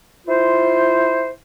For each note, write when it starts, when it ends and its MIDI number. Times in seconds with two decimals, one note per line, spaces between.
0.27 1.31 64
0.27 1.31 65
0.27 1.31 72